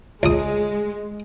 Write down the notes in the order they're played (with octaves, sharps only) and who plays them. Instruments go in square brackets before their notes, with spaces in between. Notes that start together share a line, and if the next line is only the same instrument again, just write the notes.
[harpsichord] C#2 D#6 [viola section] G#3